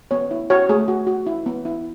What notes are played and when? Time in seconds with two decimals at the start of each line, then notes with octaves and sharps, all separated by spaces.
0.11 B3 C#5
0.31 E4
0.50 F#4 C#5
0.69 A3 G#4
0.88 F#4
1.07 F#4
1.26 E4
1.46 B3
1.65 E4